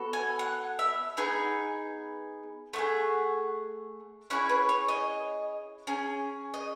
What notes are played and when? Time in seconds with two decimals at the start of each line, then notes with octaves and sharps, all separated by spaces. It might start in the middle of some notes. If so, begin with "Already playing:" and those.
Already playing: B3 F#4 A4
0.13 G#5
0.39 F#5
0.79 E5
1.17 B3 D#4 G#4 G#5
2.73 A3 E4 F#5
2.78 G#4
4.30 C#4 E4 G#4 F#5
4.49 B4
4.69 C#5
4.88 D#5
5.87 C#4 G#4
6.54 D#5